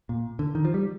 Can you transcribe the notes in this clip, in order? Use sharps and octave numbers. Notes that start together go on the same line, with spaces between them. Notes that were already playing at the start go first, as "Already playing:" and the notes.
A#2
D3
D#3
F3
G3